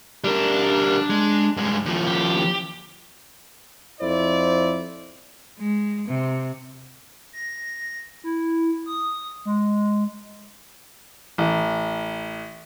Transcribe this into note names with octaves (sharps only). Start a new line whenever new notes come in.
G3 D4 A#4
G#3
G2 G#3
D#2 F3
G4
F2 E4 C5 D5
G#3
C3
A#6
E4
D#6
G#3
A1